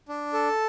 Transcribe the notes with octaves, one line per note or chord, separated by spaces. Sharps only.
D4
A4